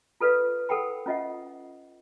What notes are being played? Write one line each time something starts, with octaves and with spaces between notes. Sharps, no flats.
F4 A4 B4 D5 F5
A4 A#4 F#5 G5 B5
C#4 F4 D#5 E5 F#5